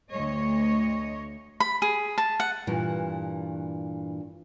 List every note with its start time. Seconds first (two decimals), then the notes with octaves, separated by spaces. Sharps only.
0.12 D2 C#5 D#5
1.60 B5
1.82 G#4
2.18 A5
2.40 F#5
2.67 G2 A#2 E3